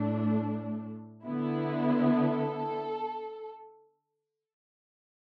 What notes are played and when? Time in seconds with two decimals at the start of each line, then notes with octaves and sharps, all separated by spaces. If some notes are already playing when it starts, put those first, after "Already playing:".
Already playing: A2 A3 D4
1.25 D3 B3 E4
2.19 A4